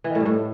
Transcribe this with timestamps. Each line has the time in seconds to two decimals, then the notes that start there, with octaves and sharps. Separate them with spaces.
0.04 E3
0.10 D#3
0.15 A2
0.20 G2
0.26 A2